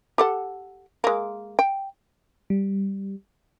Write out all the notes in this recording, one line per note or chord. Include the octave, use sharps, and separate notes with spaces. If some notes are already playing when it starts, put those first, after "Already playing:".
G4 A4 F#5
G#3 A#3
G5
G3